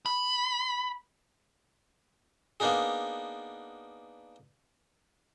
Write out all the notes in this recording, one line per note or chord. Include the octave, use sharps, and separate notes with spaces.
B5
A#3 B3 D4 D#4 G#4